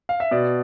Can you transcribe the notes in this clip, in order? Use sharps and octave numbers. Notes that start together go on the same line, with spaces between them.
F5
E5
B2 D5